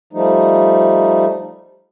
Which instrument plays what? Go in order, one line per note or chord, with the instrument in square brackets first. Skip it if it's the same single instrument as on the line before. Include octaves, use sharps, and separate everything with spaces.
[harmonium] F3 G3 A3 D#4